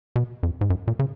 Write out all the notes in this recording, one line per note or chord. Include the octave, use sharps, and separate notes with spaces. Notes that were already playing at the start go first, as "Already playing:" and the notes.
B2
F2
G#2
F#2
A#2
C#3